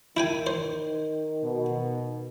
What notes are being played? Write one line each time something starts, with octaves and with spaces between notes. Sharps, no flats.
D#3 E4 G5 G#5
C5
B2